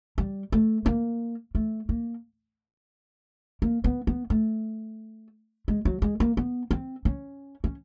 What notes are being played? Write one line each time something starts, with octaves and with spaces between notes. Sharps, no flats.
G3
A3
A#3
A3
A#3
A#3
B3
B3
A3
G#3
F#3
G#3
A#3
B3
C4
C#4
C#4